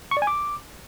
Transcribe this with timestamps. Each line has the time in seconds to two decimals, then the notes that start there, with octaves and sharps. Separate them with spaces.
0.11 C#6
0.17 D5
0.22 G#5
0.27 D6